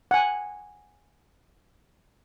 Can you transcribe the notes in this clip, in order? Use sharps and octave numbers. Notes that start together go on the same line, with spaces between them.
F#5 G#5